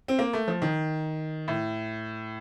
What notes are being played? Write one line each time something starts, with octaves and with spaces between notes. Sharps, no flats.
C4
A#3
A3
F3
D#3
A2